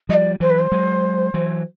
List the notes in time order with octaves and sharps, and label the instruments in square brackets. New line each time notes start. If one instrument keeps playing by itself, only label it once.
[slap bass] F3 G3 [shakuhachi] D5 D#5
[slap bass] E3 F#3 [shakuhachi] C5
[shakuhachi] B4
C5
[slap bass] F#3 G#3
E3 F#3